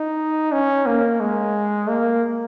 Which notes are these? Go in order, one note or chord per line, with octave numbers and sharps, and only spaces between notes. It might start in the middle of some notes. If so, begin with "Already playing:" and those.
Already playing: D#4
C#4
A#3
G#3
A#3